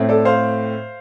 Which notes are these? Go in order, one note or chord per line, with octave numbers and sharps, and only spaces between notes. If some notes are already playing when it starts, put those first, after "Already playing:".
Already playing: A2 A3 C4
A4 D5
C5 F5